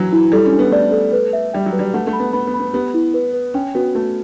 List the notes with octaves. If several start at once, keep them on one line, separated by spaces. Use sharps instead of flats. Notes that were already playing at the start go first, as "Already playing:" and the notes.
Already playing: E3 F#3
E4
G3 A4
C#4
D4
B3
A3 D5
A4
B4
E5
G3 G5
F#3
B4
G3
A3 F#5
A3
B5
B3
B3 B5
B3
B5
B3
B3 G4
E4
B4
B4
C#4 G5
B3 F#4
A3 F#4